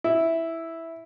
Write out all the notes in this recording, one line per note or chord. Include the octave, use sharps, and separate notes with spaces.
E4